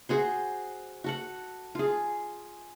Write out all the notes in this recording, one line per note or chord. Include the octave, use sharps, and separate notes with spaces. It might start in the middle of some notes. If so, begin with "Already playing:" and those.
F#4 G#4 C5
F#4 A4 F#5
F4 G#4